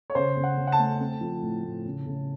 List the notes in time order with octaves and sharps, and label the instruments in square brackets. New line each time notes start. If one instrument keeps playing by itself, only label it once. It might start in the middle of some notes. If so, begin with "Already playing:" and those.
[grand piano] C#5
C#3 C5
C#3
F#5
C#3
F#5
A5
A3
C4
F3
A2
A2
C#3
C#3